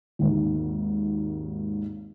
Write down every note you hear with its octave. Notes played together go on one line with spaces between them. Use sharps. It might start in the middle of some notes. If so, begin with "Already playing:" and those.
G#1 D#2